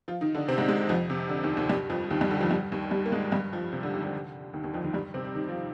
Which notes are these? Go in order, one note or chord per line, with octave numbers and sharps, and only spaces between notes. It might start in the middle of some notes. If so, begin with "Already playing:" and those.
F3 F4
D#3 D#4
D3 D4
C3 C4
G#2 G#3
G#2 G#3
F2 F3
C3
D3
D#2 D#3
D#2 D#3
G2 G3
F2 F3
D#2 D#3
G2 G3
D3
F2 F3
G2 G3
D#2 D#3
G2 G3
A#3
G#2 G#3
G2 G3
F2 F3
C3
D3
D#2 D#3
D3
D#2 D#3
D#2 D#3
F2 F3
D#2 D#3
G2 G3
C3 C4
D#3 D#4
F3 F4